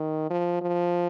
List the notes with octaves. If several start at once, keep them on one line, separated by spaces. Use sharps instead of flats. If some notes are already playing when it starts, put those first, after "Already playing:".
Already playing: D#3
F3
F3